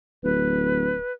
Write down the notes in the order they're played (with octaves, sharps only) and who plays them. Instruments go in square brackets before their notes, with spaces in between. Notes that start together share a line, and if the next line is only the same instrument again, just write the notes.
[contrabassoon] D1 [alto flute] B4